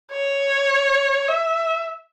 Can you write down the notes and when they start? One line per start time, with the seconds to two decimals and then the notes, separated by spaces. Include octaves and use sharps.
0.11 C#5
1.28 E5